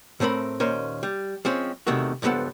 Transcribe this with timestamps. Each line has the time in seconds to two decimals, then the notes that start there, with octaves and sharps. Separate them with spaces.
0.20 A2 A3 C4 A#4 B5
0.60 D#2 A#2 C#4 A#4 C5
1.03 G3
1.45 F3 G#3 C4 C#4
1.87 E2 C3 D#3 A3 F#4
2.22 C#2 G2 F3 B3 A4 F#5